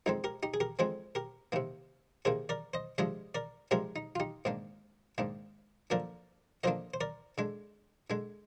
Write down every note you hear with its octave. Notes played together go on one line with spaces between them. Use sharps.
F2 D3 G#3 C4 D#4
G4 A#4
D#4 G4
G#4
G4 A#4
F2 D3 G#3 C4 G#4 C5
G4 A#4
C3 D#3 A#3
C3 D#3 A#3 G#4 C5
A#4 D5
C5 D#5
C3 F3 G#3 D4 C5 D#5
A#4 D5
C3 F3 G#3 D4 G4 A#4
D#4
F4
D#4 G4
G#2 D#3 A#3 D4
G#2 D#3 A#3 D4
D3 F3 A#3 D4 A#4 D5
D3 F3 A#3 D4 C5 D#5
C5
A#4 D5
D3 G#3 D4
D3 G#3 D4